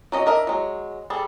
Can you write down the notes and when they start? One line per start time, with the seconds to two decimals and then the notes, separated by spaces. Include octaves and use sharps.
0.12 F#3 C#4 D#5
0.26 D4 A#4 D#5 E5
0.47 F#3 G#3
1.10 G3 G#4 A4